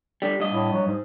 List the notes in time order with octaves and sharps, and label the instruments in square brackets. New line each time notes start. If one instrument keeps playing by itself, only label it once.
[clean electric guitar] D3 G3
G2 D#5
[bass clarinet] A2
F#3
G#2